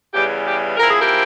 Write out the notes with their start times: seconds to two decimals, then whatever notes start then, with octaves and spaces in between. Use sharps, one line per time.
0.14 E2 C#3 E3 G3 G4
0.46 G4
0.77 G#2 F3 C4 E4 A#4
0.90 G#4
1.01 G4 A#4